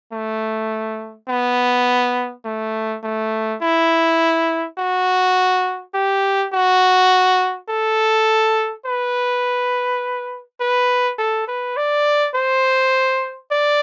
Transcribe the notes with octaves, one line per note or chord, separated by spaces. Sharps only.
A3
B3
A3
A3
E4
F#4
G4
F#4
A4
B4
B4
A4
B4
D5
C5
D5